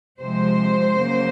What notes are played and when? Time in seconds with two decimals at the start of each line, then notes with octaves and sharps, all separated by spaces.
0.21 C3 F3 G#3 C5
0.99 C#3 F#3 A#3